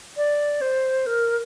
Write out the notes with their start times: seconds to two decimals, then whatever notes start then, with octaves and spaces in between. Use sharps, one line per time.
0.17 D5
0.61 C5
1.06 A#4